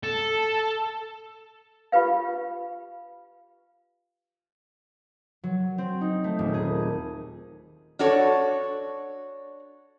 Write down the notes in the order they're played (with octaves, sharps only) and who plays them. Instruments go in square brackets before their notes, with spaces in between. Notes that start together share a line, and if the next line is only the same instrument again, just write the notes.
[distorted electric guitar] A4
[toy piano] F4 G4 B4 F5
[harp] F#3
C4
D#4
A3
D#1
G#4
[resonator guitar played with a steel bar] D4 F#4 A4 C#5